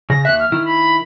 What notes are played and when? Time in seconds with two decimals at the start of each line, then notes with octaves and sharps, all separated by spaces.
0.10 C#3 A#6
0.25 D#2 E5 F#6
0.40 F6
0.52 D#3 E4
0.65 B5